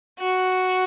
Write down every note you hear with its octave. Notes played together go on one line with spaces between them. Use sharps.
F#4